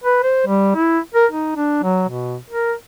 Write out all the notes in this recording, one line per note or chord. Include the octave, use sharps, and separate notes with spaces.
B4
C5
G3
E4
A#4
D#4
D4
F#3
B2
A#4